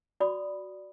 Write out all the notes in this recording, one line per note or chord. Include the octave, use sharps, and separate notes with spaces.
F#4 D5 B5 D#6